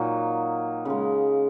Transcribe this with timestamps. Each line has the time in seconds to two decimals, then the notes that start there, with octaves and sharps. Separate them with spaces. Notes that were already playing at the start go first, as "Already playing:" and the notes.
Already playing: A#2 F#3 D#4
0.85 C#3 G#3